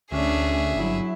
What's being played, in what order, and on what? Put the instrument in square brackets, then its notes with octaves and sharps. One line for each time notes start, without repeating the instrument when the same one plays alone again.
[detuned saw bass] D2 [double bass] C#4 D4 [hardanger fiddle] G#4 E5
[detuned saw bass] G1 [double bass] F#3 E4